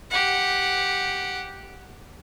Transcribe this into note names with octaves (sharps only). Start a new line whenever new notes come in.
G4 F#5